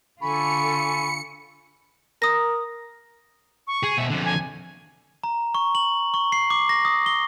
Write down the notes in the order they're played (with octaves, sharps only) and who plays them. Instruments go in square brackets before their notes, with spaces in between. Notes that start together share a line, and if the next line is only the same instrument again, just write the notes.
[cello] D3 F4 [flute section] A4 G#5 C#6 [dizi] B5 [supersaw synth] C#7
[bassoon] A#4 [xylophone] D#6 A#6
[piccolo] C#6
[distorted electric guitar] G#4
B2 E5
F2 D3
[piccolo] G#5
[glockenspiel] A#5
C#6
F#7
C#6
C7
D6
A#6
D#6
G7